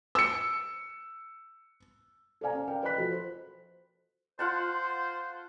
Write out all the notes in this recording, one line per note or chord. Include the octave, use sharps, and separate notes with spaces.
E6 C#7
A4 C5 D5 F5 G#5 A#5
C#4
A#4 D5 F5 G5
B4 C5 D#5 B5 F#6 B6
F3 F#4 A4
C5
F4 C5 F#5 A5